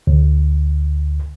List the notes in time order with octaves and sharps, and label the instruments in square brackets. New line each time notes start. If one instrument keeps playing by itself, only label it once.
[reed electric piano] D2